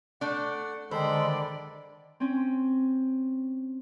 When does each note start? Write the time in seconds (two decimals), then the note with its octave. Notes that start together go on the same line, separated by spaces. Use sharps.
0.21 A3 D4 F#5
0.91 D3 D#3 G#3 A4 C5 D5 B5
2.20 C4 C#4